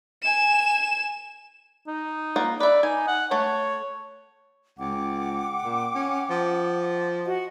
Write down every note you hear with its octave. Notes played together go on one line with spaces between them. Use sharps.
G#5 E7
D#4
A#3 F4 F#5
B4 D5 E5
D#4 G#5
F#5
A3 C#5 F#5
C#2 F#5 G5 D6
A#2
C#4
F3
F#4 D#5 F#5